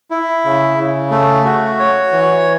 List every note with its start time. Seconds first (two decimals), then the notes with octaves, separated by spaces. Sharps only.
0.11 E4
0.45 C#3
0.78 C#3
1.11 A3
1.45 F#4
1.79 C#5
2.12 E3